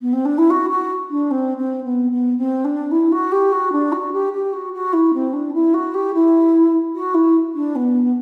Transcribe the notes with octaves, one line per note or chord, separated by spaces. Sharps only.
B3
C4
D4
E4
F#4
F#4
D4
C4
C4
B3
B3
C4
D4
E4
F#4
G4
F#4
D4
F#4
G4
G4
F#4
F#4
E4
C4
D4
E4
F#4
G4
E4
F#4
E4
D4
B3